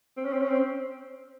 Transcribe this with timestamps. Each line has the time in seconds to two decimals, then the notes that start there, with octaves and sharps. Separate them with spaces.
0.17 C4
0.25 C#4
0.33 C4
0.41 C#4
0.50 C4